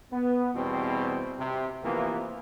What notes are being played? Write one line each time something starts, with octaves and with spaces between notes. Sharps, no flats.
B3
E2 B2 G3 C4
C3
C3 E3 F3 A#3 B3